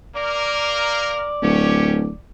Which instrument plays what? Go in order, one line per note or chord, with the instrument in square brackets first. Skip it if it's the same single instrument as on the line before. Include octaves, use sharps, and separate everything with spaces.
[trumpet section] A#3 A#4 [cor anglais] D5
[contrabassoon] D1 [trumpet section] C#4 G4 C#5